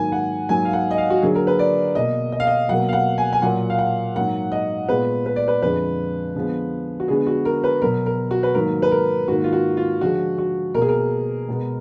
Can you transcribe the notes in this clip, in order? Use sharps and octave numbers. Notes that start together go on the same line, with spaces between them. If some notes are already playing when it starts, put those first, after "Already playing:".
Already playing: G#2 D#3 F#3 A#3 G#5
F#5
G#2 F#3 A#3 G#5
F5
F#5
D#5
F5
F#4
D3 F#3 A#3 G#4
A#4
B4
D5
B2 A#3 D#5
D#5
F5
D#5
B2 F#3 A#3 F#5
F5
F#5
G#5
G#5
A#2 F#3 A#3 F#5
F5
F#5
G#2 F#3 A#3 F#5
D#5
A#2 G#3 B3 B4
B4
D5
B4
F2 D3 G#3 B4
D3 F3 G#3 B3
F#4
D3 G#3 B3 G#4
F#4
A#4
B4
B2 F#3 B3 A#4
A#4
F#4
B4
G#2 D#3 F#3 A#3 A#4
B4
A#4
G#2 D#3 A#3 F#4
F4
F#4
F4
D3 F3 G#3 F#4
F#4
B2 A#3 A#4
G#4
A#4
B2 G#3 B3